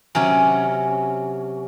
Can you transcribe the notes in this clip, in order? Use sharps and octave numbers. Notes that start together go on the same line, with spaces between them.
C3 F#3 C#4 G#5